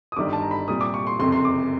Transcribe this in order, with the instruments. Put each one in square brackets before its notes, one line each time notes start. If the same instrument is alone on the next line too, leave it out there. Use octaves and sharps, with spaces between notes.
[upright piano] D#6
G1 G2 D#3 G3 D6
A5
A#5
B5
C2 A#2 G3 D#6
D6
C#6
C6
F#1 F2 C3 C6
C6
D6